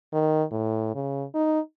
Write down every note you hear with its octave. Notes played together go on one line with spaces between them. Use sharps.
D#3
A2
C#3
D#4